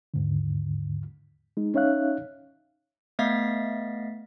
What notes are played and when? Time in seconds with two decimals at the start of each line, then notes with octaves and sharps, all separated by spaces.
0.14 D#2 G#2 D3
1.57 G#3 D#4
1.74 C#4 D#4 C#5 E5 F5 F#6
3.19 A3 B3 D#5 F5 A6 B6